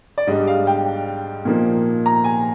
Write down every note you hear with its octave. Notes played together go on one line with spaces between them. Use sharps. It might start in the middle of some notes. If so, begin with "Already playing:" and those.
D5
G#2 G3 D4 D#5
F5
G5
A#2 F3 A#3 D#4
A#5
G#5